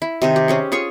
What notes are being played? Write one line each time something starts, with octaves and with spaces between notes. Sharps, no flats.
E4
C3 D#3 D#4
G4
C#4 G4 G#4
F4 G#4 C#5 C#6